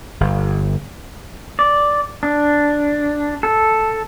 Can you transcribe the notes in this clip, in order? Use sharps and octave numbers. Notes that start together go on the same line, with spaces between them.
G1
D5
D4
A4